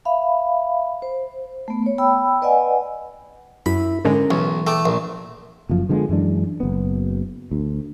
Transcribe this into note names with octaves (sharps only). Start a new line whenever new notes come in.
E5 F5 B5
C5
A3 B3
B3 C#5
G5 B5 E6
B4 D5 D#5 F#5 G#5
F#2 E4 B5
G#2 D3 G#3 C#4 A#4
B1 E3 C#4
A3 G5 D6
A#1
F#1 F#2 F3
D3 F3 G#3 B3
F#2 E3 G#3 D4
F#1 B3
D2